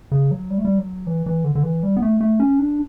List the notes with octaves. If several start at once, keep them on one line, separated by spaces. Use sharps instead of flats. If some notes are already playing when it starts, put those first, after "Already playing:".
C#3
F#3
G3
A3
G3
F#3
E3
E3
D3
D3
E3
G3
B3
A3
A3
C#4
D4